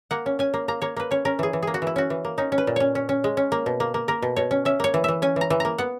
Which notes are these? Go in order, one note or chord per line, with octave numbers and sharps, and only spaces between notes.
A#3 F#5
C#4
C#4 G#5
A#3
A#3 A#5
A#3 C#5
A#3 B4
C#4 C#5
C#4 A#4
E3 G#4
E3
A#3 G#4
F#4
E3 E4
C#4 F#4
E3
A#3
C#4 D#4
C#4
B4
A#2
C#4 C#5
C#4
C#4
G#3
C#4
A#3
B2
A#3
A#3
A#3 A#4
B2
B2 C#5
C#4
C#4 E5
A#3 C#5
E3
E3 E5
C#4 G#5
E3 A#5
E3
A#3 A#5
B3 F#5